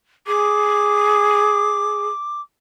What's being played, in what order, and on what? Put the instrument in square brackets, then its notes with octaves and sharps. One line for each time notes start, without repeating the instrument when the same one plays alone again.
[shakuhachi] G#4 [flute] D6